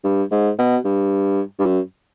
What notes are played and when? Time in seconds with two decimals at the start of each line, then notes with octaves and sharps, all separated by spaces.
0.05 G2
0.31 G#2
0.59 B2
0.85 G2
1.59 G2
1.66 F#2